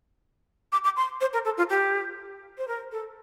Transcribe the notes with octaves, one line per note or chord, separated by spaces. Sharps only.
D6
D6
C6
C5
A#4
A4
F4
G4
C5
A#4
A4